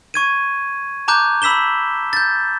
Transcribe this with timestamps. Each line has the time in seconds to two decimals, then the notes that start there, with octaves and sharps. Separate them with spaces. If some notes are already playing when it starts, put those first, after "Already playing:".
0.14 C#6 G#6 D#7
1.08 A5 A#5 D6 F#6 G6
1.42 B5 E6 B6 E7 G7
2.13 G6 A6